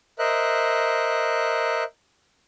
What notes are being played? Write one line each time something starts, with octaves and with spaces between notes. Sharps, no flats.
A#4 C5 D#5 E5 F#6